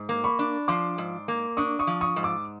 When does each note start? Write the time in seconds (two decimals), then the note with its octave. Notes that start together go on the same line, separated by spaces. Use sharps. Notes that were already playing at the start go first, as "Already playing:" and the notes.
Already playing: G#2
0.09 A#3
0.24 B5 C#6
0.39 D4
0.68 F3 C6 D6
0.98 G#2
1.28 A#3
1.57 D4 C#6 D#6
1.79 C#6 D#6
1.87 F3
2.01 C#6 D#6
2.16 G#2
2.23 D6 E6